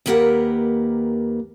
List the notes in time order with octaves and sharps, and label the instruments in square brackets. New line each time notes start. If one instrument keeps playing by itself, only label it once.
[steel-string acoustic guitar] D#2 A#3 G4 A#4 B4 F#5